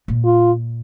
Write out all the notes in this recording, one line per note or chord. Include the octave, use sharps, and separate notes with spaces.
A#2
F4